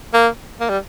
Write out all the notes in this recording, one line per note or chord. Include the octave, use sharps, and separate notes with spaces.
A#3
A#3
G3